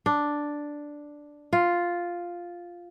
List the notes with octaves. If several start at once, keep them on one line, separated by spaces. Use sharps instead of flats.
D4
F4